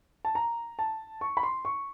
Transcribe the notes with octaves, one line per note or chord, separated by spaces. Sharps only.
A5
A#5
A5
C#6
B5
C6
C#6